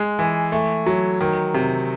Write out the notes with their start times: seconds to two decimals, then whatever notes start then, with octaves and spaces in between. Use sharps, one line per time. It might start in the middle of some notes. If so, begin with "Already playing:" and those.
Already playing: G#3
0.19 E3
0.52 A3
0.86 F#3
1.21 D#3
1.54 C3